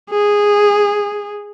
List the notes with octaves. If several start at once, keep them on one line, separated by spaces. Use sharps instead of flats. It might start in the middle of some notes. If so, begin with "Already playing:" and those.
G#4